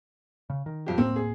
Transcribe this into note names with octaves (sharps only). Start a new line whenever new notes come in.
C#3
D#3
F2 G4
D1 A2 A#3 C4
G#4